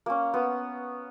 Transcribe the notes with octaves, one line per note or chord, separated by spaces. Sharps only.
A#3 C#4
B3